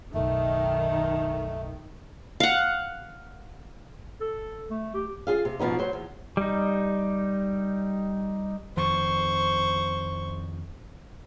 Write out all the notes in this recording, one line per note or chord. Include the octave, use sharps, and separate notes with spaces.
F#1 B1 D#3 A3
F5 F#5
A4
A3
G4
F4 G#4 F5
C3
G#2 B2 F3 B3 D#4
F#3 C5
E2
G3 D#4
F2 D#3 F3 C5 C#6